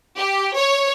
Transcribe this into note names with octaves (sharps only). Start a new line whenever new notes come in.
G4
C#5